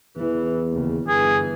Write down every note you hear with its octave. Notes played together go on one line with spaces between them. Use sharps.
E2 E3
D#2 C#3
G1 E3 G#4